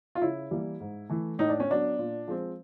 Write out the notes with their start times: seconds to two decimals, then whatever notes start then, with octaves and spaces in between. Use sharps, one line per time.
0.15 F4
0.22 C#3 E4
0.51 E3 G3 A#3
0.80 G#2
1.10 E3 A3
1.39 A2 D#4
1.49 D4
1.60 C#4
1.69 F#3 B3 D4
1.99 A#2
2.28 F3 G#3 C4